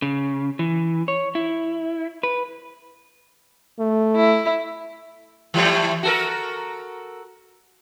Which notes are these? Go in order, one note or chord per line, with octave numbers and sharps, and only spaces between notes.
C#3
E3
C#5
E4
B4
A3
E4
E3 G3 A3
F#4 A4 A#4